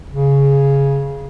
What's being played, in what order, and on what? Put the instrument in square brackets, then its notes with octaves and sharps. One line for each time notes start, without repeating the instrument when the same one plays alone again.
[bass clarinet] C#3